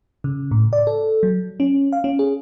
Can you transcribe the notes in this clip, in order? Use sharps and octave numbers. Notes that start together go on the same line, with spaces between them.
C#3
A2
D5
A4
F#3
C#4
F5
C#4
G#4